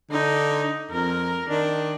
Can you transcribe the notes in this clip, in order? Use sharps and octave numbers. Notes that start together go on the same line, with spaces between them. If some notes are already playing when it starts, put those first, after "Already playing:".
D3 D#4
F2 A#4
D#3 D4